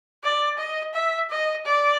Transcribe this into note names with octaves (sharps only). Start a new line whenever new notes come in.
D5
D#5
E5
D#5
D5